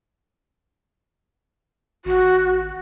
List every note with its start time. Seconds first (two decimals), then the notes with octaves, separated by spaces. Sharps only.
2.05 G#1 F#4